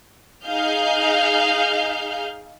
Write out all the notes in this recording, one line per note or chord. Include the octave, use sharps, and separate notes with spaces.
D#4 G#4 F5 F6 G6